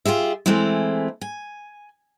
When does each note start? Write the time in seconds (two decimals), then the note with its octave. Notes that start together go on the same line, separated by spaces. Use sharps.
0.05 F4 G4 G#4 E5
0.46 E3 G#3 A3 C4 E4
1.21 G#5